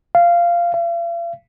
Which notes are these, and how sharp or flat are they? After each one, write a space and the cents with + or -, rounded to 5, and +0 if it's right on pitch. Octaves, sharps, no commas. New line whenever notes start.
F5 -15
F5 -45